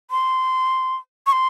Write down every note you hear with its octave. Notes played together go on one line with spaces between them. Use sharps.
C6
C#6
C6